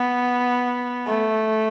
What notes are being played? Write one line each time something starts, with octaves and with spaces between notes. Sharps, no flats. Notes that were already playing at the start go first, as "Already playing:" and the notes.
Already playing: B3
A3